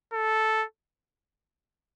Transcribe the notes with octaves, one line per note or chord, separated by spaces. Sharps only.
A4